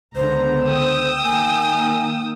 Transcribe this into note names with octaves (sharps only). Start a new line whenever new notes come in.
C#2 D3 B3 C5 A#5
G5 D#6 E6
D#3 A#3 G#5